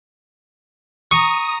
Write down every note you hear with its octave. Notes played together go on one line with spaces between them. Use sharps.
A#5 C#6 D#6